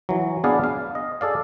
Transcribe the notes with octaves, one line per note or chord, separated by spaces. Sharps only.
E3 F#3
B3 D4 G#4 B4 D5 F5
F5
D#5
G#4 A4 D5 F5